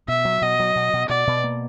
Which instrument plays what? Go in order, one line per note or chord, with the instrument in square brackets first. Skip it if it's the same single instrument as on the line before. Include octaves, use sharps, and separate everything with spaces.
[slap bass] B2 [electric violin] E5
[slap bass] F#3
[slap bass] B2 [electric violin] D#5
[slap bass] F#3
B2
B2
[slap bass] B2 [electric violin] D5
[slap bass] B2
A#3